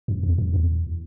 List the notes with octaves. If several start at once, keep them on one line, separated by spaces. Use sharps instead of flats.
F#2
E2
F#2
E2